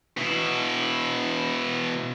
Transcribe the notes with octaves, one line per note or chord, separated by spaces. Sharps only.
B2 E4